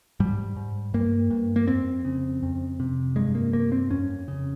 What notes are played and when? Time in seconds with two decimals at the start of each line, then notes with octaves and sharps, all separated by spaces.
0.20 G#2 G3
0.56 G#2
0.94 G2 A#3
1.30 G2
1.56 A#3
1.68 F2 C4
2.05 C#3
2.43 F2
2.80 C3
3.16 G2 G#3
3.35 A#3
3.53 G2 A#3
3.72 C4
3.91 F2 C#4
4.28 C#3